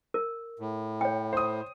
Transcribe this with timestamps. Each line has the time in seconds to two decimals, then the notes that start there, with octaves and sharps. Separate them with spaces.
0.14 A#4
0.59 A2
1.01 C#5 G5
1.33 C5 D#6